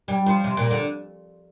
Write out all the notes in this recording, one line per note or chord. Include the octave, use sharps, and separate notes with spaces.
G3
F3
C3
A#2
D3